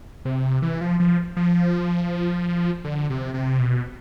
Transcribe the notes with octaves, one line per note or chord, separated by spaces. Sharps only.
C3
E3
F3
F3
F3
D3
C3
C3
B2